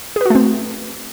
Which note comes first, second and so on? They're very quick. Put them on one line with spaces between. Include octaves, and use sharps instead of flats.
G#4 B4 F#4 A3 C4